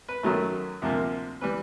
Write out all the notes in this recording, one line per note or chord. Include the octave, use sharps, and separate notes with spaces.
B4
F#2 D#3 F#3 A3
D2 C3 F3 A#3
E3 G3 B4